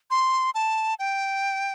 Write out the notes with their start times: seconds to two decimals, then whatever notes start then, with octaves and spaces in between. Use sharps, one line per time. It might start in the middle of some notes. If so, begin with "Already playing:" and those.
0.11 C6
0.55 A5
0.99 G5